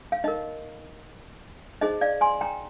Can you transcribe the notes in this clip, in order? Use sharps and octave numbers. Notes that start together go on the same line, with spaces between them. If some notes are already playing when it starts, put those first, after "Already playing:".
F5
D#4 A#4 D#5
D#4 G#4 C5 D#5
D5 F5
G#5 C6
G5 A#5